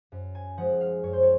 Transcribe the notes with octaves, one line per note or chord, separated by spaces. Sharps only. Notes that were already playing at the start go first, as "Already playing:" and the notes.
F#2
G#5
F3 G#3 F#5
F5
F#2 C#5
C5
C#5